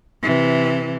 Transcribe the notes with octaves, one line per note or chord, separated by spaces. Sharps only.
C3 E3